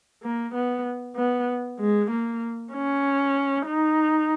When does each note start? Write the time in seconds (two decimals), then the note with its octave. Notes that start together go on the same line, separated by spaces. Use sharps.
0.23 A#3
0.55 B3
1.16 B3
1.80 G#3
2.11 A#3
2.73 C#4
3.67 D#4